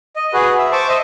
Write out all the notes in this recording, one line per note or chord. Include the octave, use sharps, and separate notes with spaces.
D#5
F#4 G#4 B4
E5
C5 A5 C#6 D6
C5 D#5 E5